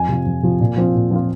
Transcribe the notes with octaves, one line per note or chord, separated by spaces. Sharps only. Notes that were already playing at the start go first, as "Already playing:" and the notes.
Already playing: F2 G#5
C3 F3
F2
C3 F3
A#2
F3 C4 F4
A#2
F3 C4 F4